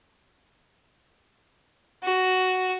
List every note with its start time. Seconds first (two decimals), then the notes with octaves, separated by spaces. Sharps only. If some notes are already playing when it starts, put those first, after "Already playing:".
2.03 F#4